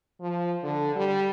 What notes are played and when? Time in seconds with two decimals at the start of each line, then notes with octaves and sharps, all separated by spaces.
0.21 F3
0.63 D3
0.95 G3